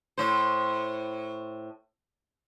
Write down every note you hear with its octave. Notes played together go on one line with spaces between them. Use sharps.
A2 C5